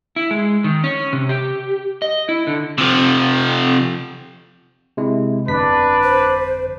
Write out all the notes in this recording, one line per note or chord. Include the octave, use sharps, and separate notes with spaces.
E4
G#3
D#3
C#4
C3
G4
D#5
E4
D3
C3 F3
C3 G#3 E4
G1 F2 D4 B4 B6
C5